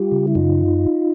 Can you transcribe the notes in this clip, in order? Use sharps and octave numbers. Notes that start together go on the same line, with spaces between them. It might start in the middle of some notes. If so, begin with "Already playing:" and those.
Already playing: G3 F4 G4
C#3
E4
F#2 D#4 F4